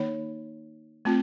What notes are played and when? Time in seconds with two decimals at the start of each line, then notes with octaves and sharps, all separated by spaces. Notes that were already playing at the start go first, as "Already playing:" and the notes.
Already playing: D#3 A#3 D#4 C#5
1.05 A3 C4 F4